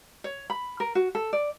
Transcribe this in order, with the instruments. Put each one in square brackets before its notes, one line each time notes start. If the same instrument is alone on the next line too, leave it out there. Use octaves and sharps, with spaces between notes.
[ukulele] C#5
B5
A#4
F#4
A4
D5